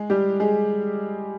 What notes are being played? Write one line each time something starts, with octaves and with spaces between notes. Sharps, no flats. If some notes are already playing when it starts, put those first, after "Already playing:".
Already playing: G#3 G#4
G3 G4
G#3 G#4